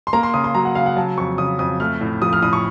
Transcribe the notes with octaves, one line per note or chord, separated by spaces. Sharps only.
C6
A#3 A#5
C6
C#3 D#6
C6
F#3 A#5
F#5
C#3 F5
F#5
F#3 A5
F2 C#6
C#3 D#6
F2 D#6
A3 F6
A2
F3 D#6
F6
A2 D#6
C#6